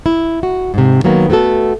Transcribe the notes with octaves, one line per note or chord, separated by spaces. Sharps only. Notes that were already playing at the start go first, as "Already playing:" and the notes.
E4
F#4
G#2 C3
D#3 F#3 A#3 B3
A3 B3 F#4 A4